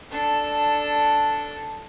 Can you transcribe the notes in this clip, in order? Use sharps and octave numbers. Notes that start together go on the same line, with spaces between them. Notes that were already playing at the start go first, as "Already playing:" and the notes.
D4 A4